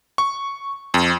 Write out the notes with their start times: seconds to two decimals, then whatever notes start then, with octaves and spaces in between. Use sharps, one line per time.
0.18 C#6
0.94 F2